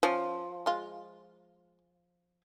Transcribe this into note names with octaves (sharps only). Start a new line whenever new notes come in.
F3 C#4
G#3 F4